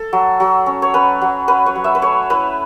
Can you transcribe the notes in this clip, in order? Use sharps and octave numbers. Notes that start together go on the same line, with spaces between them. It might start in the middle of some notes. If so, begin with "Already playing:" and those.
Already playing: A4
F#3
F#3
C#4
C#5
C#4 B4
F#3
C#4 B4
C#5
F#3
E5
B4
A3 C#5
E4 B4